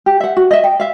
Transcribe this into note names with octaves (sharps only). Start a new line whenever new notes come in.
G4
E5 F#5
F#4
D#5 E5
G5
E5 F5